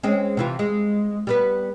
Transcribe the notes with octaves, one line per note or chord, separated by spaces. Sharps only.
G#3 C4 C#4
C3 E3 F4
G#3
G3 B3 B4